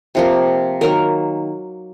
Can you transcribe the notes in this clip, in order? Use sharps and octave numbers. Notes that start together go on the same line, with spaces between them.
C3 F3 A#3
D#3 F#3 A#3 A#4